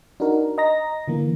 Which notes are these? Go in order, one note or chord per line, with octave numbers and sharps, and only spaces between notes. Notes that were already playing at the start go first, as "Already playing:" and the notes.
D4 D#4 F#4 A#4
D#5 A#5 A#6
D3 E3 A#3